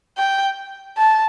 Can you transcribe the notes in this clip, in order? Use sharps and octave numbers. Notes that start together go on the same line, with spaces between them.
G5
A5